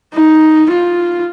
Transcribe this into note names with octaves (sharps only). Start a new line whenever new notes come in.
D#4
F4